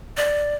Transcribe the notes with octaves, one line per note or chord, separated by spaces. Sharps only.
D5